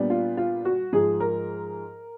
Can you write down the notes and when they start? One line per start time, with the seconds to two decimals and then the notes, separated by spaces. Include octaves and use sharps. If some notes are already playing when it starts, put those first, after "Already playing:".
Already playing: A#2 G3 B3 D4
0.10 F4
0.37 F4
0.65 F#4
0.93 G#2 F3 G#3 G#4
1.20 A#4